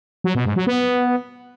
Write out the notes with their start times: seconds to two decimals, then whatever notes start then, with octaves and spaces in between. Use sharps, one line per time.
0.24 F#3
0.35 B2
0.46 G#2
0.56 F#3
0.67 B3